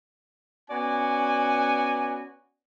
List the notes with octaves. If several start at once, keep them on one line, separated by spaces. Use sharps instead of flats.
B3 C#4 F#4 D5 F#5 G#5